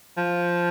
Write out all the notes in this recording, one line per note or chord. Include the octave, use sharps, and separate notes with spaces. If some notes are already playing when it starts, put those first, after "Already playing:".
F3